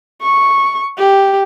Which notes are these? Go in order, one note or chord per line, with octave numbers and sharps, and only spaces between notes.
C#6
G4